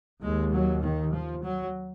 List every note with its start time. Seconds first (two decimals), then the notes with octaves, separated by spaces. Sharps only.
0.22 D#2 G#3
0.53 F#3
0.82 D#3
1.12 F3
1.42 F#3